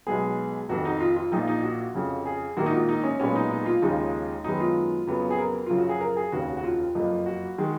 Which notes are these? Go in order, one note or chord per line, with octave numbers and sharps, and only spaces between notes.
B1 B2 G#3 B3 G#4
F1 F2 D#3 F#4
D#4
F4
F4
A#1 A#2 F3 D#4
D#4
F#4
F2 C#3 F3
G#4
A#1 G#2 D#3 A#3 F#4
D#4
F4
D#4
C#4
B1 A#2 G#3 B3 C#4
D#4
D#4
F4
D#2 C#3 F3 G#3 D#4
F#2 D#3 G#3 B3 D#4
F4
F2 C#3 F#3 B3
G#4
A#4
F#2 C#3 F3 F4
F#4
G#4
A#4
G#4
F1 D#2 C#3 F#4
F#4
F4
F#1 F2 F3
F#4
D#3 G#3